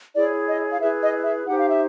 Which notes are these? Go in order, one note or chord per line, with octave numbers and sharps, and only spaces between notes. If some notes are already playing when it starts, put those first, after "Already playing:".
E4 G#4 C#5 D5
D#5
F5
E4 G#4 B4 E5
D#5
E5
D#4 G4 C5 F#5
F5
E5